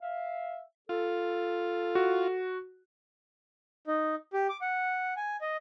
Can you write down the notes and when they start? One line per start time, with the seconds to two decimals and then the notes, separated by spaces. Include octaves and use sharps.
0.01 E5 F5
0.89 F4 A4
1.95 F#4
3.87 D#4
4.33 G4
4.49 D6
4.62 F#5
5.17 G#5
5.41 D#5